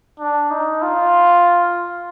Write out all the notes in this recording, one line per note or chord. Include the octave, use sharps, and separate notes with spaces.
D4
D#4
F4